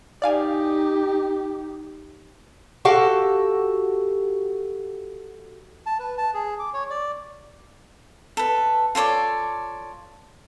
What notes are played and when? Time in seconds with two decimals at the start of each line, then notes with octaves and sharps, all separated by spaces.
0.22 D#4 G4 D5 F5 G#5
2.85 F#4 G4 A4 F5
5.86 A5
5.99 B4
6.18 A5
6.34 G#4
6.59 D6
6.74 C#5
6.90 D5
8.37 A4 B4
8.95 F4 A4 C#5 D5